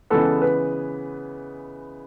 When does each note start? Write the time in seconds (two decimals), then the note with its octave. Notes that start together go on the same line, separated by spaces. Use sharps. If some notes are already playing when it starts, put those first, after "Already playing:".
0.10 C#3 E3 G#3 B3 A4
0.42 B4